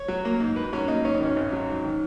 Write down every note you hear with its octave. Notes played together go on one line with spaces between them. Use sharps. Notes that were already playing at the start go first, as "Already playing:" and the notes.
Already playing: C#5
F#3
A#3
G#2
G#2 B4
F#3 C#4
A#3 D#4
G#2 C#4
D#4
D#3 C#4
G#1
F#3
G#2
D#3